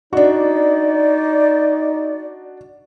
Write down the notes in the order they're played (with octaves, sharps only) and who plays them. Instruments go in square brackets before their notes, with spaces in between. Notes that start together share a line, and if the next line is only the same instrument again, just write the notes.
[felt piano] D4 F#4 [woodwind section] D#4 D5